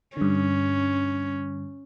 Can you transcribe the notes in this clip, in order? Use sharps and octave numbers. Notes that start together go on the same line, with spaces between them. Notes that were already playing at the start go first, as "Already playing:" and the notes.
G2 D3 C#4